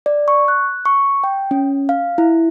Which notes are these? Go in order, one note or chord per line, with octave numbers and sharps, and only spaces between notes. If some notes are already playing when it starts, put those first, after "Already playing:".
D5
C#6
F#6
C#6
G5
C#4
F5
E4